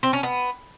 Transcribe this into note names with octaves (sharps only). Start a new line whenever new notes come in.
C4
C#4
B3